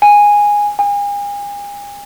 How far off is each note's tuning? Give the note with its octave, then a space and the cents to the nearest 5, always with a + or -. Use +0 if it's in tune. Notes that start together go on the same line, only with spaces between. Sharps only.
G#5 -10
G#5 -40